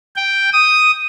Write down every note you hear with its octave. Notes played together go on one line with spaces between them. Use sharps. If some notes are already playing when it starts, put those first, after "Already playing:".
G5
D#6